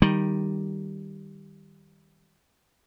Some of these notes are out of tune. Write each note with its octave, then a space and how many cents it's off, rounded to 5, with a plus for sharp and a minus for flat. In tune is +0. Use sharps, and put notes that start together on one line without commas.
D#3 +0 G3 +0